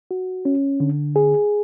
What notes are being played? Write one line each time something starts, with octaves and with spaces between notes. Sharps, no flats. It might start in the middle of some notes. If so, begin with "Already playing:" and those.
F#4
C#4
D3
G#4